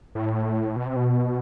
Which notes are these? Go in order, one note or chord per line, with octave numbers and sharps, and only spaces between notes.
A2
B2
C3
B2